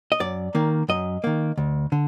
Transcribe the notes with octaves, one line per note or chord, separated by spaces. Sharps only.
D#5
F#2 D5
D#3 A#3
F#2 D#5
D#3 A#3
D2
D3